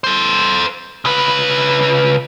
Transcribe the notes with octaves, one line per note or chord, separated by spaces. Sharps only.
A4 C5
C#3 B4